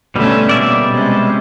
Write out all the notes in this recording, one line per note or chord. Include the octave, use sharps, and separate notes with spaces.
B2 D3 G3 A3 C#4
A#2 D3 D5 E5
C3 G#3 C#4